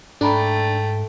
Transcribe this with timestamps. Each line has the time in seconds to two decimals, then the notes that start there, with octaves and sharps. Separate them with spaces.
0.21 G#2 A3 D4 A4 G5 A#5 B5